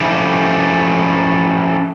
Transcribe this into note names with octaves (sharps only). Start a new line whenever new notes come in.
F3 A3 C#4 E4 G4